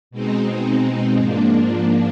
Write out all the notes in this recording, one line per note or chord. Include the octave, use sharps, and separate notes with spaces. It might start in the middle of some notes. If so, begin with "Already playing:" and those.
B2 G#3 C4 D#4
G#2 F3 A#3 D4